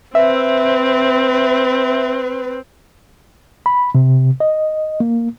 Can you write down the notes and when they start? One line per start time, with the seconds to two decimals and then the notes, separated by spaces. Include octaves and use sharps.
0.15 C4 B4 E5
3.66 B5
3.95 C3
4.40 D#5
5.00 A#3